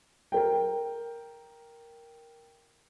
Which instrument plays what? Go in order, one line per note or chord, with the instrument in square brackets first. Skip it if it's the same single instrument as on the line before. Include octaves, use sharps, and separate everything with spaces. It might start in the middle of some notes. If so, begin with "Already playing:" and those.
[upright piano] A#4 G5